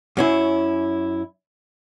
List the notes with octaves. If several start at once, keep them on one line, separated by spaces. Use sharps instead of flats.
F#2 C#4 E4